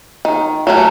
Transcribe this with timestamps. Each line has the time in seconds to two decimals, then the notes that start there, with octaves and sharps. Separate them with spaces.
0.25 D#3
0.67 F#3 A3 C#4